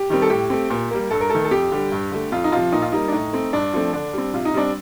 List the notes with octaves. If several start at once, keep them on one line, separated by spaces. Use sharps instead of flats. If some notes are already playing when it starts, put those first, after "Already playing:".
Already playing: G4
D#3 G3 C4
A4
A2 G4
A3 C4
A#2
G3 A#3
G2 A4
A#4
D#3 A3 A4
A4
F2 G4
D3 G3
G2
D3 A3
F2 F4
D#4
C3 F3 F4
A#2 D#4
F4
G3 A#3 D#4
D4
A2 D#4
A3 C4
G2 D4
F3 A3 C4
D3 D4
G3 C4
C3 F4
D#4
G3 C4 D4